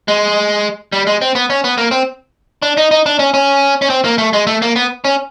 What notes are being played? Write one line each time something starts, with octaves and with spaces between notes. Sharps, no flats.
G#3
G3
G#3
C4
B3
C#4
B3
A#3
C4
D4
D#4
D#4
D4
C#4
C#4
C#4
C4
A#3
A3
G#3
A3
A#3
B3
C#4